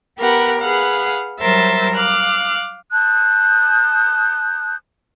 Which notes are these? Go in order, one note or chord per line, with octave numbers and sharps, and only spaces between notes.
B3 G4 A#4 B4 F#5
G#4 B4 F5 F#5
F#3 G3 A#4 C5 E5 A6
F5 D6 F#6
A5 D#6 F#6 G6